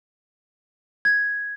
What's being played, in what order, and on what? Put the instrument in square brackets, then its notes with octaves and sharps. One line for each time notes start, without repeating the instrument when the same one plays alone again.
[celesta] G#6